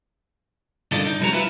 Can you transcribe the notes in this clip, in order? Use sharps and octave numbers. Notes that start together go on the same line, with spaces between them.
G2 D3 D#3 F4 D5 D#5
D#4
B1 F2 G3 F4 F#4 A#5
E4 F4 B4 E5